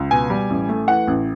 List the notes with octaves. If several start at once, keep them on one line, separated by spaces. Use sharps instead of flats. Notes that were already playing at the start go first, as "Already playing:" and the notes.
Already playing: C#2
B2 G#5
G3
A1
A3
E3 F#5
A1